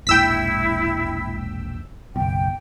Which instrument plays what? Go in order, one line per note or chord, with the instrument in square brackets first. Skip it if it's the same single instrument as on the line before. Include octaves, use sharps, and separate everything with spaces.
[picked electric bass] E1 A#1 G#2 [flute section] E4 [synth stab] G5 E6 B6
[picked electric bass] F#1 B1 [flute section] G5